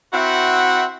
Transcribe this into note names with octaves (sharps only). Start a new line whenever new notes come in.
C4 E4 F#4 E5 F#5